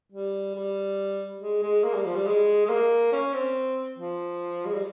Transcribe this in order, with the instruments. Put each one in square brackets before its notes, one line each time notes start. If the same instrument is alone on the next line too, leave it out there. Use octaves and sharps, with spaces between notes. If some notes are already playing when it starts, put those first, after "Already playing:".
[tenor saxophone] G3
G3
G#3
G#3
A#3
G3
F3
G3
G#3
G#3
A#3
C#4
C4
F3
G#3
G3